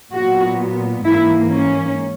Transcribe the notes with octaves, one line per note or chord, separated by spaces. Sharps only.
A#2 F#3 B3 F#4
G#2 E3 A#3 E4
C#4